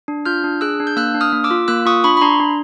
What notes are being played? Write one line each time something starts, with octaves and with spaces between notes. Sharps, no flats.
D4
F4 F6 G6
D4
G#4 E6 F#6
D4
G6
A#3 E6 F#6
D4
D#6 F6
A#3
D6 E6
F4
A#3 E6 F#6
F4 C#6 D#6
D4 B5 C#6
B5
D4 A#5 C6
D4